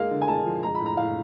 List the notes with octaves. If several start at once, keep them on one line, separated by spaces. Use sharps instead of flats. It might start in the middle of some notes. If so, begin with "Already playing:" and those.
Already playing: G#3 A#3 F5
D3
G#5
G#3 A5
F3
G#3 A#5
B5
A2
A#5
A2 F5